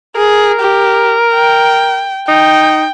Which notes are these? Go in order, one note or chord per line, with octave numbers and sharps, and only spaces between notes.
G#4 A#4
G4
G5
D#4 G5